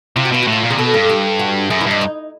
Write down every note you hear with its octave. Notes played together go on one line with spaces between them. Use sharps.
C3 F4
F#4
B2 F4
F#4
A2
F4
A#2
C3 G#4
B2 A4
G2 A4
G4
F#4
F#2 G#4
E4
G2 D#4
D#4